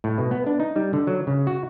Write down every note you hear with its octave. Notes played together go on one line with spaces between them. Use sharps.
A2
B2
B3
D4
D#4
G3
D3
F#3
C#3
F#4